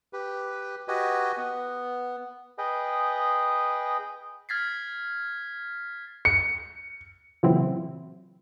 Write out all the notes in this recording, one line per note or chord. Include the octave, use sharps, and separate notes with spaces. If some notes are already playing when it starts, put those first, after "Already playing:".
G4 B4
F#4 G4 B4 D#5 G#5
B3
G#4 B4 D#5 G5
F6 G#6 A6 B6 C7
C#7
A#2 C#3 E3 F#3 C4 E4